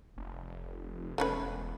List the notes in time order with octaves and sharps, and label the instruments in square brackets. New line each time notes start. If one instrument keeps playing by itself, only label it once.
[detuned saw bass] F1
[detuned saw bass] E1 [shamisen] A3 C#4 B4